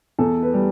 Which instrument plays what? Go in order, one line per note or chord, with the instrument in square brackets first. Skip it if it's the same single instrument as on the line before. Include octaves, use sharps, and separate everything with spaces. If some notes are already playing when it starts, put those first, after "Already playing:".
[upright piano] E2 A4
B4
G3